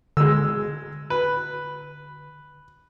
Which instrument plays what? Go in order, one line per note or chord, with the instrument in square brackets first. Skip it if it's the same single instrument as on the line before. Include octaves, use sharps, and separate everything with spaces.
[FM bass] D3 [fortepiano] G#3 E6
[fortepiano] B4